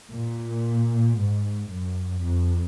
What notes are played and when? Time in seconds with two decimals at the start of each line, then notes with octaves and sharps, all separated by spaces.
0.12 A#2
1.18 G#2
1.70 F#2
2.23 F2